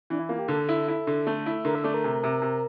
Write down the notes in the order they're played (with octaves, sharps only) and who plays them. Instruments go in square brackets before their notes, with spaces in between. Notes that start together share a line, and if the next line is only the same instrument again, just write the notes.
[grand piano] E3 [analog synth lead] D4
[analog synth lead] E4
[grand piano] A#3 [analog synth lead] F4
[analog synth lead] G4
[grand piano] D3 [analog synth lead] A4
[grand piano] E4
E4
D3
A3
E4
[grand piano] D3 [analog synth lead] A#4
[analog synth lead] E5
[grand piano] A3 [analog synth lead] D5
[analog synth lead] A#4
[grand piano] C3
C3
C3